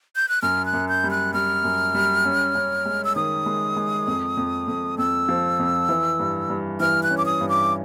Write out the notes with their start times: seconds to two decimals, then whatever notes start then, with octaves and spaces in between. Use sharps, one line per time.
0.16 G6
0.29 F#6
0.42 F#2 F6
0.66 F#6
0.73 F#2
0.89 G6
1.04 G3
1.11 F#6
1.34 G3 F6
1.64 F#2
1.94 G3
2.25 C#4
2.55 C#4
2.85 G#3
3.04 E6
3.16 D#3 D#6
3.46 G#3
3.76 G#3
4.07 F2
4.37 F2
4.68 F2
4.98 F2 E6
5.29 F3
5.59 F2
5.89 E3
6.19 G2
6.50 G2
6.80 E3 F6
7.03 F#6
7.11 C#4
7.18 D6
7.26 D#6
7.41 G2
7.49 D6